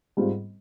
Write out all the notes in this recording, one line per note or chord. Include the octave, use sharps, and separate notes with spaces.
G#2 G3 C4 F4